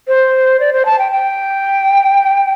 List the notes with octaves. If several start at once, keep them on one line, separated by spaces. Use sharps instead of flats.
C5
D5
C5
A5
G5
G5